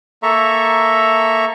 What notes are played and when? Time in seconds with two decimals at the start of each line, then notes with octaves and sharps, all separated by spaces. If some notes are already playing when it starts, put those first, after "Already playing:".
0.23 A#3 A4 E5 A#5 C#6